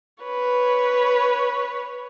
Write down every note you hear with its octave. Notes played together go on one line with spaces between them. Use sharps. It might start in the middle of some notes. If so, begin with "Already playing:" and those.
B4 C#5